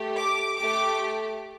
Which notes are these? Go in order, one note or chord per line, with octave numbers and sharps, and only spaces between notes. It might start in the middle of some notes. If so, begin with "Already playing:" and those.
Already playing: A3 G4
D6
A3 G4 D6